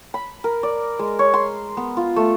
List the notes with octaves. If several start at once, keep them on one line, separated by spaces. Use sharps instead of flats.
B5
A#4
D5
G#3
C#5
C6
B3
F4
A3